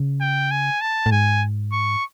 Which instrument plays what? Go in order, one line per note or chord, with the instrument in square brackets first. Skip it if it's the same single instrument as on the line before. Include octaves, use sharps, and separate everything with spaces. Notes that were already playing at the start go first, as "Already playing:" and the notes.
Already playing: [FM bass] C#3
[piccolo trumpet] G5
G#5
A5
[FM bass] A2
[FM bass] G#2 [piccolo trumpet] G#5
[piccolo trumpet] C#6